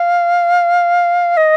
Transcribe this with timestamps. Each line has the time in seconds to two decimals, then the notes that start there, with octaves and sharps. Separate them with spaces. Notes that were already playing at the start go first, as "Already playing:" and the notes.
Already playing: F5
1.37 D#5